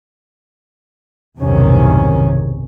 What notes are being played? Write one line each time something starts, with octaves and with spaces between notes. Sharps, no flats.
B1 E2 G2 C3 D#3 C#4